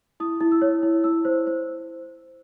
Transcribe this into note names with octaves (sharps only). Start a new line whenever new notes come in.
E4 D#6
E4
E6
C#5
E4
E4 E6
C5
C5